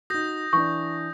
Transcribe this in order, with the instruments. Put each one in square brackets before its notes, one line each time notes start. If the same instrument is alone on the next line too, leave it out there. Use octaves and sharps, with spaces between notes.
[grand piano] D#4 F#4 [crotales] D#6 G6 A#6
[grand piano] E3 D4 [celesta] C#6